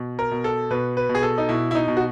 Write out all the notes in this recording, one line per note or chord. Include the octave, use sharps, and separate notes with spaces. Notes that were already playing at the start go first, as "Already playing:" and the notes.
Already playing: B2
A#4
B2
A4
B2 B4
B4
B2
G#4
A4
D#4
B2 E4
E4
D#4
B2
F#4